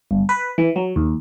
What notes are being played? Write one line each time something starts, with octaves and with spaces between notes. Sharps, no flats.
G1
B4
E3
F#3
D#2